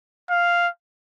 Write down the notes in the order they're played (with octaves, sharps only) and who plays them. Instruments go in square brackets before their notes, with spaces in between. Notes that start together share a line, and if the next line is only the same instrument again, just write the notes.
[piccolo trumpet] F5